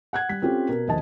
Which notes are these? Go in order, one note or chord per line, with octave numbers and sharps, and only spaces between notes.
F#5 F#6 G#6
G3 B6
C4 C#4 F4 G4 A4
B2 A#4
D#1 A#1 D#5 A5